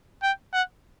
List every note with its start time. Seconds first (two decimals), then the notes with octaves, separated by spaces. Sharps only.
0.23 G5
0.53 F#5